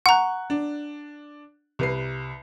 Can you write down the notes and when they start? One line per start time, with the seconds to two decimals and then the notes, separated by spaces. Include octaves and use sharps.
0.06 F#5 A#5 C#6 F#6
0.50 D4
1.79 C2 B4 C7